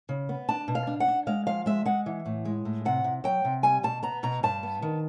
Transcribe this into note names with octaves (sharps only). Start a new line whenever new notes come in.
C#3
B3
D4 A5
B2
F5
D4
F#5
D4
G#3 F5
F3 F5
G#3 E5
G#3 F#5
E3
A2
G#3
A2
C3 F#5
C3
F#3 G5
C3
G3 G#5
B2 A5
B3 A#5
B2 A#5
G2 A5
B3
D#3